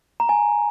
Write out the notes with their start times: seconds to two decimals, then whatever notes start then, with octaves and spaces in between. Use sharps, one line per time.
0.20 A#5
0.29 G#5